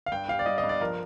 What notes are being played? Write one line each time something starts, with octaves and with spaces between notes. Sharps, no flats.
F5
G2 G5
G3 F5
D5
G3 D#5
D#5
G2
D5
F3 A#4